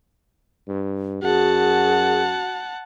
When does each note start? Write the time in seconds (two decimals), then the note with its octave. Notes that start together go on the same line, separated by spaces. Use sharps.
0.68 G2
1.23 F#2 F#4 G#4 F#5 A5